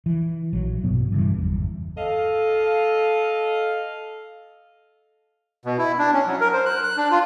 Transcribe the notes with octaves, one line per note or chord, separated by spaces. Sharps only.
E3
A#1 F#3
G2 B2 F#3 B3
G2 C#3 E3
G1 E2
A4 D#5 F5
B2
E4
D4
C#4
F#3
A#4
C5
F#6
F#6
D4
F4